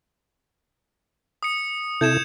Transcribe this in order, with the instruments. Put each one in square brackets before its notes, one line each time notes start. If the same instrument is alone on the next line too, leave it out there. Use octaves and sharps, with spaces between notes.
[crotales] D#6 C#7
[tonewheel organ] C3 E4 A4 [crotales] G6 G#6 E7